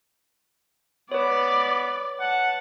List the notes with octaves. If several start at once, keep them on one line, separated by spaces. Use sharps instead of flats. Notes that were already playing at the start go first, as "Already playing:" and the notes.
B3 B4 C#5 D5
F#5 A5